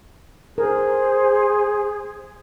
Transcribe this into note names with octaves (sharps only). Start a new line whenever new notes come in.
G#4 A#4 C5